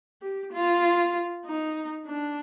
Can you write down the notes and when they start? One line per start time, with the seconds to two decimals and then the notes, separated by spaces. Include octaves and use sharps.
0.22 G4
0.52 F4
1.46 D#4
2.07 D4